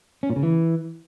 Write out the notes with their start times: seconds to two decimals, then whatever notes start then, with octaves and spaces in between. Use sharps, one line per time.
0.23 C#4
0.30 A#2
0.36 C#3
0.43 E3